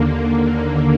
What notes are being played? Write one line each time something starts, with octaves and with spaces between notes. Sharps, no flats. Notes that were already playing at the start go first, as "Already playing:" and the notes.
Already playing: D#2 D3 A#3